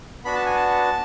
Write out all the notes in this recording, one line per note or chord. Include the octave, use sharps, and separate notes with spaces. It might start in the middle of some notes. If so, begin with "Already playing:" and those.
B3 D4 F#4 B5
A5
G#5
A5